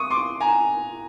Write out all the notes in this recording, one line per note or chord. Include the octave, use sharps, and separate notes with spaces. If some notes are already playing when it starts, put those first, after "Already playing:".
Already playing: C#6 D#6
C6 D6
G#5 A#5